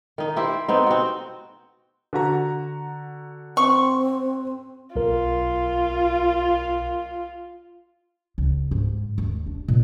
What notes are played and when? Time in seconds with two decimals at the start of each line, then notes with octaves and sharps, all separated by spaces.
0.18 D#3 D#4
0.36 E4 G4 C5
0.68 B3 C4 D#4
0.86 C4 F#4
2.13 D3 F#4 A#5
3.57 C4 C#6
4.96 B1 F4 A#4
8.38 C#2
8.71 G#2
9.18 D#2
9.46 D4
9.68 A#2